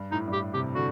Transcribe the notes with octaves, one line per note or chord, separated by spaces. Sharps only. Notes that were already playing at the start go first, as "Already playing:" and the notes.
Already playing: G2
A2 D#4
G2
A2 G4
C3 G4
D3 F#4